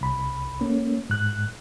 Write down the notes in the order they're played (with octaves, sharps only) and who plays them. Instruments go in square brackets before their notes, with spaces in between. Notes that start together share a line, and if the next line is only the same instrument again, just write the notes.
[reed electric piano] C2 B5
A3 A#3 C#4
G#2 F#6